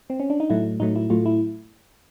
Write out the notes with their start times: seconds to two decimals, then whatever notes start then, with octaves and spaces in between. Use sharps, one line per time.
0.10 C4
0.20 C#4
0.30 D4
0.40 D#4
0.50 A2 F#3 A3 E4
0.80 A2 F#3 A3 D#4
0.95 E4
1.10 A2 F#3 A3 F4
1.25 E4